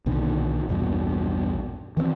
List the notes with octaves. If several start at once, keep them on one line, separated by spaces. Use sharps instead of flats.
B1 A#2 D3 D#3
A#1 E2 G2 B2
D#3 E3 A3 C4